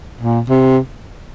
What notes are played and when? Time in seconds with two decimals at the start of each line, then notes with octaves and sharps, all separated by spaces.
0.21 A#2
0.49 C3